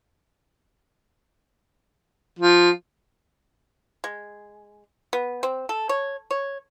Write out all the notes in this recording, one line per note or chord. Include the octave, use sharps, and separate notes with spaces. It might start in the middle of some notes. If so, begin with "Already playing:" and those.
F3
G#3
B3
C4
A4
C#5
C#5